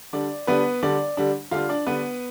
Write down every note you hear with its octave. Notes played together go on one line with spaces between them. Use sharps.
D3 G3 D4 D5
D3 G3 B3 D4 B4
D3 G3 D4 D5
D3 G3 D4
D3 G3 D4 F4 F5
D4 D5
D3 G3 B3 D4 B4